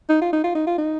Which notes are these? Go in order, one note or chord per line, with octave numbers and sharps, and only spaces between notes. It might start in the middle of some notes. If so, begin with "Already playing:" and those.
D#4
F4
D#4
F4
D#4
F4
D#4